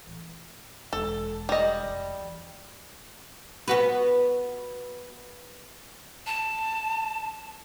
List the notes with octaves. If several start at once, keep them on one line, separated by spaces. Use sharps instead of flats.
A2 E3
E1 G#3 A4
G3 D#5
F1
E2
B3 F#4 B4
A5